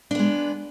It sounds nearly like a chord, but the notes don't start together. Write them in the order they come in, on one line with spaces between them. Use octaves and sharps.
D4 B3 G#3